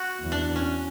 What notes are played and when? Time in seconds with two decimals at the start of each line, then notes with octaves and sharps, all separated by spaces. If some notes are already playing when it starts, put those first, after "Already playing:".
Already playing: F#4
0.20 E2
0.32 D4
0.56 C#4